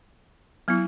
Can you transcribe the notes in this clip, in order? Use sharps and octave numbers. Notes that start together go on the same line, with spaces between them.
F#3 B3 E4